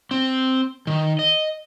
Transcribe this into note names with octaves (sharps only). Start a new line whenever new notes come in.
C4
D#3
D#5